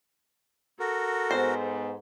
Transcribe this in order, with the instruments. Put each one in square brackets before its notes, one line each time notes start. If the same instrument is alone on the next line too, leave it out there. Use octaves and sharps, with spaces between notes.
[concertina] F#4 A#4 [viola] A4
[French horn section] G#2 B3 [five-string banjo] C5